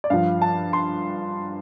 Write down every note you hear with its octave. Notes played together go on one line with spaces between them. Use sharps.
D5
G2 F3 F5
A5
C6